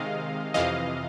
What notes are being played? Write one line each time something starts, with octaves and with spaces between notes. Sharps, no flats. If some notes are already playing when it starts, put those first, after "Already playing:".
Already playing: C3 D#3 G#3 D#5 F5
F2 C3 E3 D#5 F5